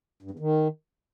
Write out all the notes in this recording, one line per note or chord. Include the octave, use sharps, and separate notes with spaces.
G2
E2
D#3